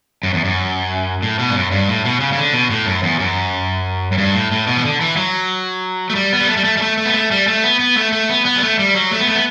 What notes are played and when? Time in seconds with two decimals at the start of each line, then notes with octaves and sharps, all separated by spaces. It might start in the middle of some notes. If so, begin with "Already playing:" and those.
0.23 F#2
0.34 E2
0.45 F#2
1.22 A2
1.39 B2
1.50 G2
1.55 F#2
1.71 G2
1.88 A2
2.05 B2
2.20 C#3
2.33 C#3
2.37 D3
2.53 B2
2.71 A2
2.86 F#2
3.03 E2
3.19 F#2
4.12 F#2
4.18 G2
4.34 A2
4.51 A2
4.67 B2
4.77 E3
4.85 D3
5.01 E3
5.17 F#3
6.10 A3
6.15 G3
6.33 B3
6.41 G3
6.49 A3
6.57 G3
6.64 A3
6.77 G3
6.82 A3
6.97 A3
7.06 B3
7.14 A3
7.31 G3
7.48 A3
7.63 B3
7.80 B3
7.96 A3
8.12 A3
8.29 B3
8.45 B3
8.57 G3
8.62 A3
8.79 G3
8.95 F#3
9.11 A3
9.19 B3
9.27 A3
9.35 B3